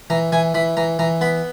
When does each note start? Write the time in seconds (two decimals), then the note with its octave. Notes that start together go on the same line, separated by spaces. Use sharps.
0.10 E3 A#5
0.32 E3 G#5
0.54 E3 B5
0.77 E3 A#5
0.99 E3 A#5
1.21 B3 B5